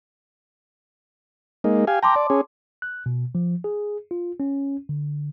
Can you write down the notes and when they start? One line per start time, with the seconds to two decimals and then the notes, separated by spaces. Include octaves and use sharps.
1.64 G#3 A#3 D#4
1.87 G4 F5 G#5
2.02 G5 A5 A#5 C6 D6
2.16 D5
2.30 C#4 G#4
2.82 F#6
3.06 B2
3.35 F3
3.64 G#4
4.11 F4
4.40 C#4
4.89 D3